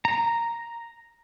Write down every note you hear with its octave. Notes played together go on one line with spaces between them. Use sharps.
A#5